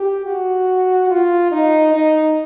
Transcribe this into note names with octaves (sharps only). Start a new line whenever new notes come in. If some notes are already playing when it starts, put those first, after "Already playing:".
Already playing: G4
F#4
F4
D#4
D#4